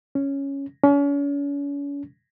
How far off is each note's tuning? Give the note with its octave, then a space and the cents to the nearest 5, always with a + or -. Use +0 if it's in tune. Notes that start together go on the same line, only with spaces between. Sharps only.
C#4 +0
C#4 +40